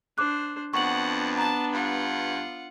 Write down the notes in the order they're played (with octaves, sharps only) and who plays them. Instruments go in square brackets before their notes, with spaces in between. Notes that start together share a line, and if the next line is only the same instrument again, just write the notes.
[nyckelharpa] D4 C5 [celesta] D6 F#6
[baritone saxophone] F2 [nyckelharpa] B3 D4 [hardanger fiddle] F#5 [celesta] C#6 F#7
[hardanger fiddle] A5 [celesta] A#5
[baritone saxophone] G2 [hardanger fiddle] F4 F#5